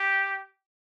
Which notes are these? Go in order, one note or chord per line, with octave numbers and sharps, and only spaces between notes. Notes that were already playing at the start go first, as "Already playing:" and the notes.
Already playing: G4